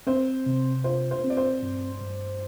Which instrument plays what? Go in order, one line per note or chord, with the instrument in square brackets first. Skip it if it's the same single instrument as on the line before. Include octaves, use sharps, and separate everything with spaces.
[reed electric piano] C4 [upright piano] C5
[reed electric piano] C3
[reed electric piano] F4 [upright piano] C5
[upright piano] C5
[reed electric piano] C4
[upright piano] D5
C5
[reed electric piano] G2
G2